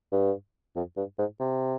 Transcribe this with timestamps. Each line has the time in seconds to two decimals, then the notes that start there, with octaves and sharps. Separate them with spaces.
0.12 G2
0.76 F2
0.97 G2
1.18 G#2
1.40 C3